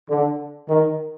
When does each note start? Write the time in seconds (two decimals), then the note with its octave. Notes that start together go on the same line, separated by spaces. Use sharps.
0.09 D3
0.69 D#3